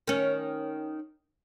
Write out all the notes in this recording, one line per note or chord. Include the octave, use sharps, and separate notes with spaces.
D#3 C#4